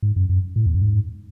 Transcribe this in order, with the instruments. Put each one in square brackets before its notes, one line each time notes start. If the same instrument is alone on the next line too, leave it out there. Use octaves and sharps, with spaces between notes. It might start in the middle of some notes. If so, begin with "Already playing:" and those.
[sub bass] G#2
F#2
F#2
A2
E2
F#2
G#2